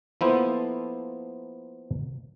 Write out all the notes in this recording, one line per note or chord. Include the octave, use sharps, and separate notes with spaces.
F3 A#3 B3 E4 A4 C5